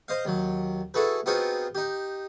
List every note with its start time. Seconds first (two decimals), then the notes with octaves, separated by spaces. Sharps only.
0.08 C5 D#5 F5
0.25 D#2 F#3
0.94 E4 F#4 G#4 A4 B4
1.26 B3 C4 D#4 F4 F#4 G#4
1.75 D#4 G4